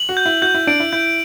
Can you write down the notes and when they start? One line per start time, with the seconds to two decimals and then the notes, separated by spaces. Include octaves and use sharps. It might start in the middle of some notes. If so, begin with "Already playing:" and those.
Already playing: F#7
0.09 F#4
0.17 G6
0.26 E4
0.42 F#4 G6
0.54 E4
0.67 D4 D7
0.80 E4
0.93 E4 G6